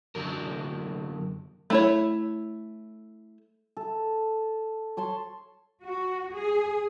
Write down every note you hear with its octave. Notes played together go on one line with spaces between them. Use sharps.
F#2 B2 D3 F#3 A#4
A3 E4 C#5
A4
C#5 A5 C6 C#6
F#4
G#4